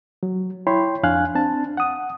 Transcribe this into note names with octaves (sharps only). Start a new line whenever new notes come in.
F#3
E4 C#5 G5 B5 C6
F2 D4 F5 G#5 F#6
C4 D4 A5
F#5 D#6